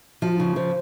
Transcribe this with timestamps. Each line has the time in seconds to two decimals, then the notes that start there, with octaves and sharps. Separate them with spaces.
0.22 F3 F#4
0.30 F4
0.37 C#3 D#4
0.45 F4
0.56 F3 C5